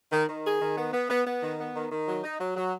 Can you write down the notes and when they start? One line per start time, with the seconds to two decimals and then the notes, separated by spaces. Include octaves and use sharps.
0.12 D#3
0.28 D#3
0.44 G#4
0.61 D#3
0.77 B3
0.93 B3
1.10 B3
1.26 B3
1.42 D#3
1.59 B3
1.75 D#3
1.91 D#3
2.08 F#3
2.24 D#4
2.40 F#3
2.56 F#3